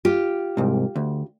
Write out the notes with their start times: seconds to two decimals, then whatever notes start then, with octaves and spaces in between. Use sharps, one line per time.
0.05 F4 G4
0.57 C2 G#2
0.96 D2